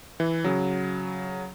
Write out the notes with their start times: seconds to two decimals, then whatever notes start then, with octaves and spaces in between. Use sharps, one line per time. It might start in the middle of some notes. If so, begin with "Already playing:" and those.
0.20 E3
0.44 C#3 F#3